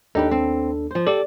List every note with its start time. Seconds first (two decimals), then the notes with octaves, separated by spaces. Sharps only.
0.15 D#2 D4 D#4 G4 A4 B4
0.31 C4
0.91 F3 C5
1.07 G4 A4 D5